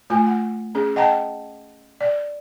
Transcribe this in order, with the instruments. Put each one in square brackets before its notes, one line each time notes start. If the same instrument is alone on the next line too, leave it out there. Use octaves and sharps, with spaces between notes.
[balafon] A3 F4 G#5
F#5
C#4 G#4
D#5 F#5 G5 A5 A#5
D5